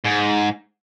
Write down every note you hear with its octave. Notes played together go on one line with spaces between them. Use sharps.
G#2